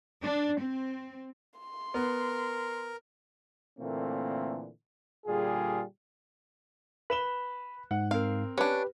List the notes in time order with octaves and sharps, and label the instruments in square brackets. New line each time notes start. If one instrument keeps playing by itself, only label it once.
[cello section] D4
C4
[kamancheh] C6
[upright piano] B3 [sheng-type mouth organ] A#4
[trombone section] A#2 D3 E3 A3 A#3 C4
A#2 D3 G3 F4 G#4
[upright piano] B4 E7 G7 [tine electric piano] B5
[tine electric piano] G#2 [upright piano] F#5
[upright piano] C4 A#4 [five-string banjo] F5
[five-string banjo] C#4 D4 [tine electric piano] G4 B4